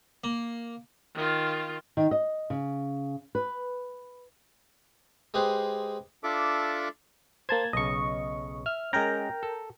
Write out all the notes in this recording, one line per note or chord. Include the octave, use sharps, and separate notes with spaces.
A#3
D#3 F4
D#3
D#5
C#3
B4
G#3 G4 G#4 B4 C5
D4 F4 A4 E5 D6
A#3 C5 A5 G#6
B1 C#3 D#5 C#6
E5 F6
G#3 C#4 A#4 G5 A#5
A4